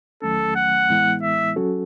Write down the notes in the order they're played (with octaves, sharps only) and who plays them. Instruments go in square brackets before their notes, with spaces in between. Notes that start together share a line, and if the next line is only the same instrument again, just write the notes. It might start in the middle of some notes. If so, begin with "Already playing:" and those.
[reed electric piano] E2 D#3 F#3 A3 C#4 [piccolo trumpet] A4
[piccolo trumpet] F#5
[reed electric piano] A2 E3 G#3 B3 E4
[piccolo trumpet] E5
[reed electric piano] F#3 C#4 F#4 A4